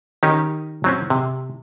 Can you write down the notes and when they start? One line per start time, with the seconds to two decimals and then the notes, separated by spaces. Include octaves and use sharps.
0.23 D#3 C#4 D#4 G4
0.84 F#3 C4 C#4
1.10 C3